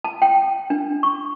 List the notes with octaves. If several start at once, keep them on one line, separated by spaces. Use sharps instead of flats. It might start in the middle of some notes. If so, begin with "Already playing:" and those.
A5
G5
D4
C#6